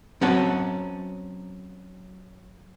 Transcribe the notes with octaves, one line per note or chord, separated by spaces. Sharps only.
F#3 C4 C#4 F#5 A5